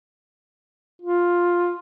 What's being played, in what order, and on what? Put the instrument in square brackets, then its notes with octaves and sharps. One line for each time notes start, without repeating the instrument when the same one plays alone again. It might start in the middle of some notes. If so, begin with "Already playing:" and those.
[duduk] F4